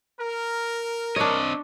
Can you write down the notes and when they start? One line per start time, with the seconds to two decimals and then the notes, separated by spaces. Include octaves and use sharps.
0.20 A#4
1.16 C4 D4 C#5 D#5